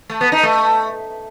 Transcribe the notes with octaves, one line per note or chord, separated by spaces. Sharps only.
A3
B3
D#4
A3